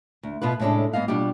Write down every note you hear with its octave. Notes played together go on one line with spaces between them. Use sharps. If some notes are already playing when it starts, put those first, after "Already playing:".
D2
B2 B3 F4 B4
A2 C3 G#3 C#4 D4 A4
G#2 B3 D#5 F5
B2 G3 D4 F4 G4